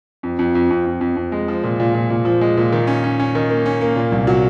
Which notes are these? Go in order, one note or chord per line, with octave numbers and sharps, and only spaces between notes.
F2
F2
F2
F2
F2
F2
F2
G#3
F3
A#2
A#2
A#2
A#2
F3
G#3
A#2
D#3
C#4
C#4
C#4
D#3
A#3
C#4
A#3
A#2
C2
F#3